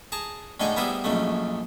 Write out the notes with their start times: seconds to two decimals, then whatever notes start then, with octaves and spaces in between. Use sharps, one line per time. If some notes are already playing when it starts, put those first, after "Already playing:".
0.12 G#4 A5 A#5
0.60 A2 D3 G#3 D#4 G5 G#5
0.77 G3 B3 E4 G#4 A#4 C5
1.04 A#1 F#2 C#3 G#3 A3